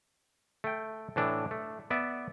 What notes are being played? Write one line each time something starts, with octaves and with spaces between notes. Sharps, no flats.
A3 G5
A2 E3 D4
A3
B3 D5 E5